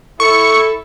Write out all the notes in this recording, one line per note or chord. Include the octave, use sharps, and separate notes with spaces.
E4 A4 C#6